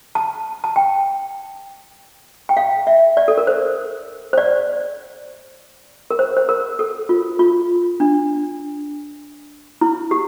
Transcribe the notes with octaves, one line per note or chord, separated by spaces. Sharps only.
A5
A5
G5
G5
F5
E5
D5
A4
A#4
C5
C5
D5
A#4
C5
C5
A#4
A4
F4
F4
D4
E4
G4